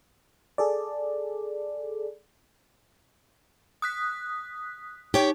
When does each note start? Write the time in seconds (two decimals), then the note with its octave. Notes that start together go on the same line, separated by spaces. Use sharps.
0.58 G#4 A4 D5
3.82 D#6 F#6 B6
5.14 D#4 G4 C#5 G5